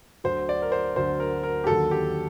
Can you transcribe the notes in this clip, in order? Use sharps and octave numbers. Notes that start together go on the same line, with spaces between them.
D2 D3 F#3 C5
D5
A#4
C5
D2 D3 F#3 C5
A#4
A#4
G4
D#2 D3 F#3 A4
G4